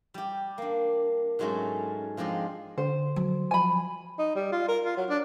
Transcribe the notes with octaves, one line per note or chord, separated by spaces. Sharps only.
G3 G4
A#3 D4
G#2 F#3 G#3 A3 C#4
F3 G#3 C4 D4 D#5
D3 C5
F#3
F3 G#5 B5
D#4
G3
F4
A#4
F4
F#3
D4